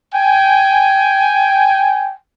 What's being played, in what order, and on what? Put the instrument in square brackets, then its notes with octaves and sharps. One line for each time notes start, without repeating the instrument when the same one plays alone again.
[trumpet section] G5 G#5